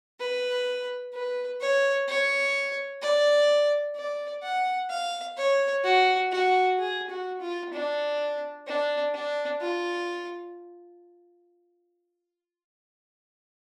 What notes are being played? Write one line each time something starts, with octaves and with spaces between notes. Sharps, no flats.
B4
B4
C#5
C#5
D5
D5
F#5
F5
C#5
F#4
F#4
G#4
F#4
F4
D4
D4
D4
F4